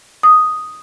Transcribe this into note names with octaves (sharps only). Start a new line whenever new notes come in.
D#6